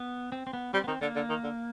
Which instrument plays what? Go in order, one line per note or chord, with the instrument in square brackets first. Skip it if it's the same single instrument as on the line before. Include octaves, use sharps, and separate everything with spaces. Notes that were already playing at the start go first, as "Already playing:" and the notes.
Already playing: [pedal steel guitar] B3
C4
C4
B3
[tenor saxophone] G3 [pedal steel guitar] C4
[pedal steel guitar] B3
[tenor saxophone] D#3 [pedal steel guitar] C4
[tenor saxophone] D3 [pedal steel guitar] A#3
[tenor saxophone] D3
D#3
D3